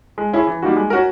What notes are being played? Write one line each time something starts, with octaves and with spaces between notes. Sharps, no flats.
G#3
C#4 E4 G#4
E3
G3 A#3 D#4 F#4
G#3
C#4 F#4 A#4